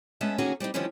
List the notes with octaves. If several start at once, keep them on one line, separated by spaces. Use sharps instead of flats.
G#3 B3 C#4 E5 A5
D2 D#3 A#3 C#4 F#4 G#4
G3 C4 D4 D#4
D3 D#3 F3 G3 C#4 E4